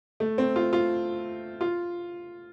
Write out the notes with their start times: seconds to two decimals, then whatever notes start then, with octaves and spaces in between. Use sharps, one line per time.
0.20 A3
0.38 C4
0.56 F4
0.73 F4
1.61 F4